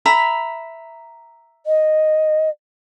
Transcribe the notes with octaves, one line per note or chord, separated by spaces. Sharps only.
E5 A#5 B5
D#5